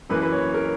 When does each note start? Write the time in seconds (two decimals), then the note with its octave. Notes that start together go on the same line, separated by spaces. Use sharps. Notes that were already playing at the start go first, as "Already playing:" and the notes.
0.10 F#2 E3 A#3 B4
0.22 B4
0.32 C#5
0.54 A#4